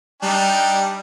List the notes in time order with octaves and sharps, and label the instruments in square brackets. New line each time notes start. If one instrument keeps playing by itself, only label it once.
[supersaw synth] G3 [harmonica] D4 D#4 [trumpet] G5